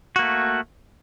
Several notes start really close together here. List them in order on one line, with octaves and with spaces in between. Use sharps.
F#4 A#3 A3